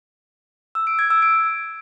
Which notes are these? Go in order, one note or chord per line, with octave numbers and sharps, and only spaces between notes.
E6
D7
G#6
E6
D7